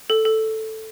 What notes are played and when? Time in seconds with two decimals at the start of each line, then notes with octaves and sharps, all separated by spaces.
0.10 A4
0.25 A4